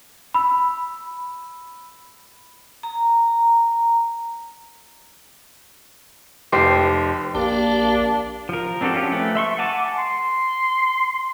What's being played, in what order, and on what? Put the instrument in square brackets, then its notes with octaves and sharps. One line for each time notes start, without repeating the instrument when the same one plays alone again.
[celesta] B5 E6
[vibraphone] A#5
[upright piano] F1 G4 C5 C7
[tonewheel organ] A#1 G4 F5 [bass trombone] A#3 [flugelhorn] D4
[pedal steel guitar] F3 A#4
C4 D4 F#4 G4 A4
F3 C#4 F4 G4
A3 B4
E5 C6 C#6
F#5 G#5 A5 D6
[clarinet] C6